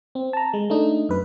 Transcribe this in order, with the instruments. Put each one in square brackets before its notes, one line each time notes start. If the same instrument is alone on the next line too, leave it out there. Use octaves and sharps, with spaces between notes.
[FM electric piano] C4
A5 A#5
G#3
A3 D4 D#4
F#2 B4